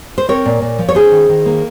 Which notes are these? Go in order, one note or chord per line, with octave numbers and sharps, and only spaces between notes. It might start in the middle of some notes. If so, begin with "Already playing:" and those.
C5
C4 A#4 C#5
A#2
A#2
F3
C#5
C#4 G#4 C5
D#3
D#3
A#3